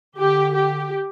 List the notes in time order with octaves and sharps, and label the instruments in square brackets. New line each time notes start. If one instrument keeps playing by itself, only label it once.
[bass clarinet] D3 [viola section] G4
[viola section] G4